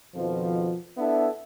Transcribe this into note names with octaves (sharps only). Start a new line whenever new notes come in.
F2 B2 D#3 F3
B3 D4 E4 A4 E5